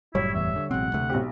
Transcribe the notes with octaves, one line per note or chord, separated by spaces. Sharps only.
F#1 A2 F#3 G3 E4 C#5
E2 E3 E5
D3 G3
A1 B2 F#3 G#3 C4 F#5
D2 C3 A3
B1 C4 F#4 G4